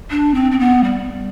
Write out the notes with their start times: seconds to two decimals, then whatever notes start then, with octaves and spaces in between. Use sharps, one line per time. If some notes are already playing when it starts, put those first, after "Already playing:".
0.10 D4
0.34 C4
0.51 C4
0.59 B3
0.84 G3